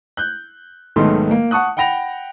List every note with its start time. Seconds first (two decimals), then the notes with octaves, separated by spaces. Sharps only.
0.17 F#6 G6
0.96 B1 G#2 D#3 A3 B3 C6
1.31 A#3
1.51 F#5 A5 C#6 D#6 F#6
1.77 F#5 G5 B5 A#6 F7